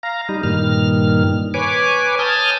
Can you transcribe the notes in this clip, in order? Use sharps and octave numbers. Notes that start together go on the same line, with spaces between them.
F5 A#5
G3 D#4
G2 A#2 D#3 F6
B4 C#5 G#5 D6
G#5 A5 D#6 F6 G6